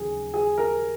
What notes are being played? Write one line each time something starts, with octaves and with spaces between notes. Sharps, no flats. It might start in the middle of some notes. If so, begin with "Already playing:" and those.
Already playing: D#2 C#3 F#3 G#4
G#4
A#4